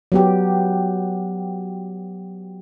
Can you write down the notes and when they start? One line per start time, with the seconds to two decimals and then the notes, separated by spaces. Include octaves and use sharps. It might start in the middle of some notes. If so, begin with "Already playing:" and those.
0.12 F#3 B3 G4